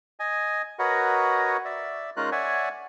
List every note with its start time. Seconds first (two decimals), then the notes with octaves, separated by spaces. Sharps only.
0.20 D#5 G#5
0.79 F#4 A#4 B4 C#5 D#5 F#5
1.65 D5 E5
2.17 G#3 C#4 D#4 F4 A#4 F#6
2.32 C#5 D5 E5 F#5 G#5